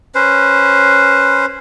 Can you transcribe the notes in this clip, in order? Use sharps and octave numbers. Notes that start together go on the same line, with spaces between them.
C#4 B4 C5